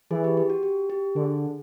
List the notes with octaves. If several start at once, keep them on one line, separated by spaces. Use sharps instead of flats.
E3 G#4
G4
G4
F#4
G4
G4
D3 G#4